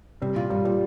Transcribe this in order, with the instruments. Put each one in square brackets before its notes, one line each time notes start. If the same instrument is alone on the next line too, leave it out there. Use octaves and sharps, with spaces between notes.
[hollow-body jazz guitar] C3 [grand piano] G3
[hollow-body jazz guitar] A#2 [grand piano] F4
[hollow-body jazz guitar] G2 [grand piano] G3
[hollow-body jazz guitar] A#2 [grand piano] G3